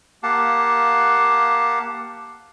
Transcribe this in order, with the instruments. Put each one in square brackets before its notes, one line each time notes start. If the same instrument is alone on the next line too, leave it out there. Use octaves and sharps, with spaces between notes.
[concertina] A#3 G4 F5 F#5 A5